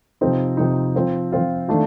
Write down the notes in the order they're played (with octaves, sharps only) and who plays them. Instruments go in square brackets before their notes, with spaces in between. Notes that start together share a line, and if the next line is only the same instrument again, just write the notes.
[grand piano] C3 F3 C4 D#4
C3 F3 C4 D#4
F3 C4 F4
F3 C4 F4
D#3 A3 D4 F4